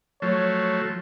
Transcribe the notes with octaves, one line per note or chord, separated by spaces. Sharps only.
F3 F#3 A3 C#5